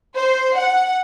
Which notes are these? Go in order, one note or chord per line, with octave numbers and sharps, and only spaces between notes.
C5
F#5